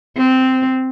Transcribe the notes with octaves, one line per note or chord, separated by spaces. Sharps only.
C4